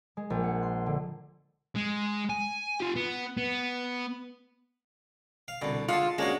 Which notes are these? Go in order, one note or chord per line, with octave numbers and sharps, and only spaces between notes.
G#3
A#1
F#5
C6
D3
G#3
G#5
F4 G4
B3
B3
F5
C2 B2 D3
D3 G#3 F4 F#5 A5
G#3 A#3 C#4 D4 F#4